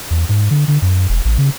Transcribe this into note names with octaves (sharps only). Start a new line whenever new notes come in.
E2
G#2
D3
D3
F#2
E1
A1
C#3